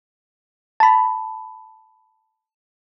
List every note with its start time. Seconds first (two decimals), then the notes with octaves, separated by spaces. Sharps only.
0.80 A5 B5